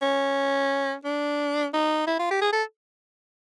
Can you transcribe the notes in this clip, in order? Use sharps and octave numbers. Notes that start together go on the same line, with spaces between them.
C#4
D4
D#4
E4
F4
G4
G#4
A4